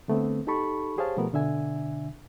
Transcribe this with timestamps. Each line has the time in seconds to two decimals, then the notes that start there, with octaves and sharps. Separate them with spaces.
0.08 D3 A3 B3 C4
0.47 D#4 G4 A4 A5 B5 C#6
0.98 G4 G#4 C5 C#5 F5 A5
1.17 B2 F3 A3 B3 G4 A#4
1.33 B2 D3 D4 E5 G#5